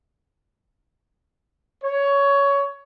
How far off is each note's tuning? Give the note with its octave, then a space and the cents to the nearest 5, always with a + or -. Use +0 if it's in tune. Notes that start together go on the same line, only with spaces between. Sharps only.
C#5 +15